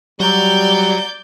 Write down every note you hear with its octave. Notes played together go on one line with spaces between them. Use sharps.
F#3 G3 F#4 D5 A#5 G6